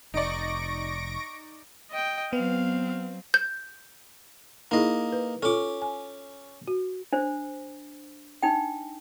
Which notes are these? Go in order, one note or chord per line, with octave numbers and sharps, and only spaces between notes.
F1 D#4 D5 C#6 A#6 D7
D#5 G5
F#3 B3 C4 F5
G6
A#3 D#4 E4 G#4 D#5
B4
C#4 F4 A4 D6
G#5
F#4
D4 C5
D4 D#4 G5